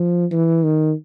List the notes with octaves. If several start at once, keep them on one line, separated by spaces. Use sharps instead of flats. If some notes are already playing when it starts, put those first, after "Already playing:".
Already playing: F3
E3
D#3